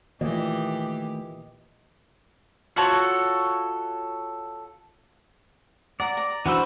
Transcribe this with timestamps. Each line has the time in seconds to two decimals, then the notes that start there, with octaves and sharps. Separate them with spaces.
0.21 A#2 D#3 E3 A3 G4 D#5
2.76 F4 F#4 A4 C#5
6.00 D5 F#5 A#5
6.17 A#5
6.46 E3 D4 F#4 B4 C5 E6